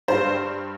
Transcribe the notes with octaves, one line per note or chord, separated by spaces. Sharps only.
G2 G3 C5